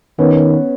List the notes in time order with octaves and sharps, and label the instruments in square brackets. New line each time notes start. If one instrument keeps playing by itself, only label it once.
[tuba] D#3 [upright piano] B3 C#4